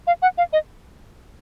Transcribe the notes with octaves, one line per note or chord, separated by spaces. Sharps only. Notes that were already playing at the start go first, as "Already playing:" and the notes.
F5
F#5
F5
D#5